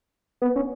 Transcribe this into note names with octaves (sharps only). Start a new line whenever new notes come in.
B3
C#4